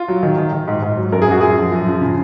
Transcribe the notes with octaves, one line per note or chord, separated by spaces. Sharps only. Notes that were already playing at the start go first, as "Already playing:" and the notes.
Already playing: F4
F#3
D#3
D#3
D#3
G#2
G#2
F#3
F#2 A#4
G#4
F#2 F#4
F#2 G#4
F3
F#2
F3
C#3